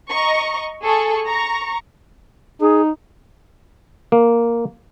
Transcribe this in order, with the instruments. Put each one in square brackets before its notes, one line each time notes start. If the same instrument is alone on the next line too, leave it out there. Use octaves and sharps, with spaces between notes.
[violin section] D#5 A#5 C#6
G#4 A4 C#6
A#5 C#6
[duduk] D#4 [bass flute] G#4
[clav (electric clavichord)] A#3